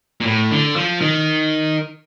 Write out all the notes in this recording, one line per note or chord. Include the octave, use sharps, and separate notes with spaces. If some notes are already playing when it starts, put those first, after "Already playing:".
A#2
A2
D3
F3
D#3